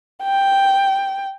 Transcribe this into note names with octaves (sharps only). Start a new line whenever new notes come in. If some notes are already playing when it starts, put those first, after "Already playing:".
G5